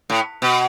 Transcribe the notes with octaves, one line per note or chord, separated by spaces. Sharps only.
A2
B2